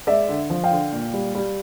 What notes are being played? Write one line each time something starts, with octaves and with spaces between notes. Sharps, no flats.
G#3 D5 E5
D3
F3
F5 G5
D3
A#2
G3
G3